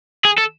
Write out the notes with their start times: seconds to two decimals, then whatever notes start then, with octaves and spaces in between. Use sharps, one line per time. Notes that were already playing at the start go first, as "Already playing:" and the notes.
0.25 G#4
0.38 A4